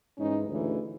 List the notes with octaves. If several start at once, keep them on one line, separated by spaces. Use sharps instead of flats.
G#2 E3 C#4 D#4
D2 C#3 E3